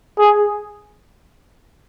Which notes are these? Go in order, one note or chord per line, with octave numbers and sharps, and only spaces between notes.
G#4